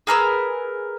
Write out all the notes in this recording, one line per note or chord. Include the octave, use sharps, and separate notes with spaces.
G#4 A#4 B4 E6